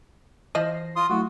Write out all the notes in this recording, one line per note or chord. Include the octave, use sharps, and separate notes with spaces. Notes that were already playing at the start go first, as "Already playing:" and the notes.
E3 F3 D#5 A#6 C7
F4 C6 D#6
F#3 A3 E4 F#4